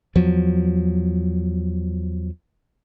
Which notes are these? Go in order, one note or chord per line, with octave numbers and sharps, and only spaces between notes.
E2 F3 F#3